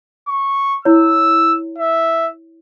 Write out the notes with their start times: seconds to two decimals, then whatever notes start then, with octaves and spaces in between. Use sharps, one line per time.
0.28 C#6
0.85 E4 C#5 E6
1.78 E5